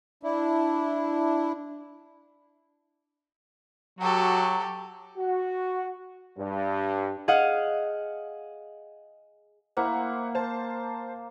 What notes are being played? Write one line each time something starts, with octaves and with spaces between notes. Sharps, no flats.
D4 E4
F#3 F#4 G4 A4
F#4
G2
G#4 D#5 F5 F#5
A#3 E4 C5 F#5
C5 A5